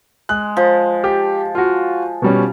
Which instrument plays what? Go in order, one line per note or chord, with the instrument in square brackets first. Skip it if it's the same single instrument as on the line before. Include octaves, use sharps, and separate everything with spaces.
[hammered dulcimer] G#3 [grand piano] F#6
[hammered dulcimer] F3
[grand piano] G4
F4 F#4
B2 G3 C#4